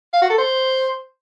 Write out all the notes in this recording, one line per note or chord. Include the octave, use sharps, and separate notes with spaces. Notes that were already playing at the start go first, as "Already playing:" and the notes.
F5
F#4
A4
C5